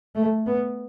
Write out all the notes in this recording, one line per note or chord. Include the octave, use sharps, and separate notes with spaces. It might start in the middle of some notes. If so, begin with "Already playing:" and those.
A3
B3